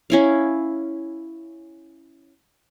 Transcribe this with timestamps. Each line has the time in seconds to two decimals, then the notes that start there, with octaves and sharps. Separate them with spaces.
0.10 C#4 E4 F5